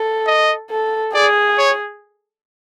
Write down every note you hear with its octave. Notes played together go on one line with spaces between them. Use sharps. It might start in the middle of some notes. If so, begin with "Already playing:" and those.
Already playing: A4
D#5
A4
G#4 D5
C#5